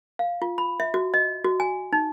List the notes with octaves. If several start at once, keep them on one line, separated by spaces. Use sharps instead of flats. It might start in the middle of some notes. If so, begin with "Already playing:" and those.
F5
F4
B5
E5
F#4
D#5
F#4
G#5
D#4